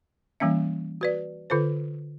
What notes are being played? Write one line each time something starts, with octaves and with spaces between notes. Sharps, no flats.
E3 G3 A#3 C#4 E5
F#4 B4 D5
D3 F4 A4 C5